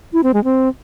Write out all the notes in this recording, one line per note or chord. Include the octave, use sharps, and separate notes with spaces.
E4
C4
G#3
C4